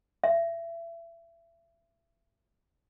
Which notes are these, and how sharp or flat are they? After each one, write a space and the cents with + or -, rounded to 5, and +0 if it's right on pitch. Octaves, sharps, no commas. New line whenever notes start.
E5 +30